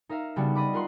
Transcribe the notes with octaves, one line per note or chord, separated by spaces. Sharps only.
D#4 A#4 E5 F5
C#3 G3 B3 D4 F#4
D5 D#5 B5 D6
F4 A#4 F#5 C6